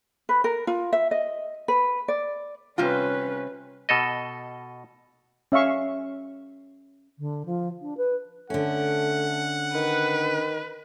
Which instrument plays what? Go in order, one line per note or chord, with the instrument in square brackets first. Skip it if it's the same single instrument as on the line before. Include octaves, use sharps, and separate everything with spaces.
[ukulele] B4
A#4
F4
E5
D#5
B4
D5
[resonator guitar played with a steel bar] C3 G3 F4 [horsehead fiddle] C#4 B4
[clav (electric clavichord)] B2 A4 D#5
[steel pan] C#4 E5 F5 C#6
[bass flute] D3
F3
D4
B4
[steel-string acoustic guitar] D3 C#4 [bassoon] A3 [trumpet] F#5
[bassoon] D#3 [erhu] B4